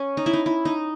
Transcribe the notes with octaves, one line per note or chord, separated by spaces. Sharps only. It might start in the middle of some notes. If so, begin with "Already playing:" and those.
Already playing: C#4
D#4
E4
D#4
E4
D#4